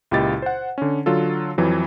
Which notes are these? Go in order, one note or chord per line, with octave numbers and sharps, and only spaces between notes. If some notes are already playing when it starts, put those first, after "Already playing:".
C#2 A#2 E4 G4 D#5 A6
C5 F#5
D3 C#4
D3 F#3 F4 A4
F2 E3 F#3